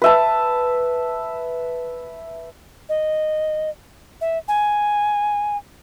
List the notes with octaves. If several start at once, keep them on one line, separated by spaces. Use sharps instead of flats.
B4 E5 A5
D#5
E5
G#5